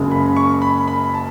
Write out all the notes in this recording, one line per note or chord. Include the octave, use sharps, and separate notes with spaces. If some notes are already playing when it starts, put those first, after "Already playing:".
Already playing: F#1 F#2 C#3 G#3
B5
C#6
B5
B5
A5